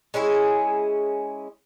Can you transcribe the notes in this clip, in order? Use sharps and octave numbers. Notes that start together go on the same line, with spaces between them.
G#3 C#4 E4 G#4